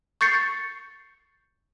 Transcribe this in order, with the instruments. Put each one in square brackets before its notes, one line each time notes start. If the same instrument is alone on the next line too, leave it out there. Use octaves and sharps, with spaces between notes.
[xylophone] C#6 G6 A6 C7 C#7